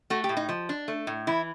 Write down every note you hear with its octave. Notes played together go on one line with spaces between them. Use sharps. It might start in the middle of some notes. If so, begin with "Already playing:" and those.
A3 F#4
G4
A2
D#4
F3
D4
A3
A2
E3 E4